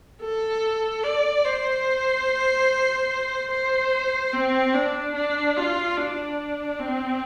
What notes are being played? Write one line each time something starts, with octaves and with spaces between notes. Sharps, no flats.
A4
D5
C5
C5
C4
D4
D4
F4
D4
C4